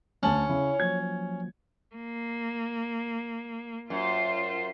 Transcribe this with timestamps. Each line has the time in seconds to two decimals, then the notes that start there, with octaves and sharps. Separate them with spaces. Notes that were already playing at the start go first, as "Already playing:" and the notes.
0.23 D2 C#4 C#5 A5 F#7
0.49 C#3 E4
0.80 F3 F#3 A#3 G#6
1.96 A#3
3.90 F#2 F4 C5